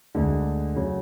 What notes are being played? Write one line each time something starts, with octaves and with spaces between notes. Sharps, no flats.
D2 D3 G#3
C#3 F#3